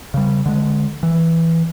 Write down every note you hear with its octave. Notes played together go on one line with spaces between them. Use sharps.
C#3 G3
D3 G#3
E3